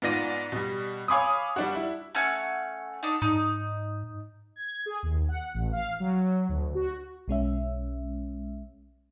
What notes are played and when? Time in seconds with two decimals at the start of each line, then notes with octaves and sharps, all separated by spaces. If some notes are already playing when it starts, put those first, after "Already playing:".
0.02 G#2 B3 F4 D5 A#6 D#7
0.52 B2 G3
1.08 C#5 F5 G#5 B5 D6 D#6
1.56 G3 D4 F#4
1.75 E4
2.15 A3 C#4 F#5
3.03 D4 D#4
3.22 G#2 D#4
4.56 G#6
4.86 G#4
5.03 D#2
5.29 F#5
5.54 A1
5.72 F5
6.00 F#3
6.49 D2
6.75 F#4
7.28 B1 G#3 C#4 E5